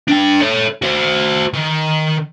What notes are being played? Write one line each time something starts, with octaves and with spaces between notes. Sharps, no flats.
D4 G5
A4 C#5
F#4 C5
D#3